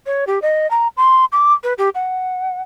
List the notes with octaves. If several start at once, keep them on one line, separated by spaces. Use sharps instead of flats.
C#5
G4
D#5
A#5
C6
D6
B4
G4
F#5